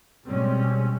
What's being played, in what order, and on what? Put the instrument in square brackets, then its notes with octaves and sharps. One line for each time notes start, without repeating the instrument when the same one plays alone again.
[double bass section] B2 G3 G#3 C4 C#4